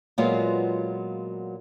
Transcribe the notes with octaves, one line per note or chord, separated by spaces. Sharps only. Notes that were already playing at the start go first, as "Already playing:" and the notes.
A#2 F#3 G#3 B3 F4